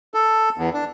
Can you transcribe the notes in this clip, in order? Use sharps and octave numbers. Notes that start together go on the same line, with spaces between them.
A4
E2
D4